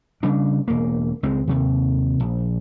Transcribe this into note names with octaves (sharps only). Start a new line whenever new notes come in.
C#3 G3 D4
E1 A#3
C#2 G#3 C4
D#2 C3
A#1